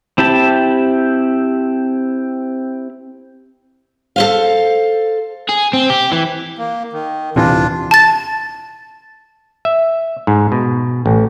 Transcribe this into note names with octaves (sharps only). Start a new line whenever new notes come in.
C4 E4 G4 A5
A4 C5 F5
G#4
C4
G4
E3
A#3
D#3
D#1 C3 E3 D4 F4
A5 A6
E5
G#2
B2
A1